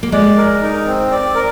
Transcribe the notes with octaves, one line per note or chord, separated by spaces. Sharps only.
A#3
G#3 D5
A#4
D#4
C4
D5
A#4